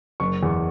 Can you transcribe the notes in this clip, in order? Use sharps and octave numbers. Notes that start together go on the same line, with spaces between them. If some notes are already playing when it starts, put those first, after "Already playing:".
F#1 C#6
E2